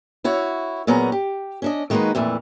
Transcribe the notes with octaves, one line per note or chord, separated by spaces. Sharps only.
E4 F#4 C#5
A#2 F#3 B3 C#4 G#4 A#5
G4
C#4 D4 D#5
D#3 G#3 A#3 D#4 F#4 B4
F2 A#2 E3 A3